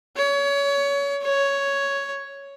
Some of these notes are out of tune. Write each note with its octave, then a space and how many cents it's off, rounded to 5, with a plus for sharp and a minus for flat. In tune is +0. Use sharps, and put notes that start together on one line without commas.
C#5 +25
C#5 +5